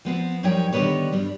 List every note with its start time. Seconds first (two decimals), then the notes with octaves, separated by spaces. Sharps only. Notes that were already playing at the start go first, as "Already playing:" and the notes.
0.05 F3 B3 C4
0.43 F#2 F3 G3 D#4 C#5 G5
0.72 D3 D#3 G3 B3 B4 C#5
1.12 G2 G3 D4